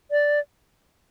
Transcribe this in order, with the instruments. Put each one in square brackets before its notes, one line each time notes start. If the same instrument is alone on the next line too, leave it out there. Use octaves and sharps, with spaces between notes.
[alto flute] D5